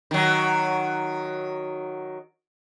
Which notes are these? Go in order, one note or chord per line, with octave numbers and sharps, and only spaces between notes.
D#3 F#3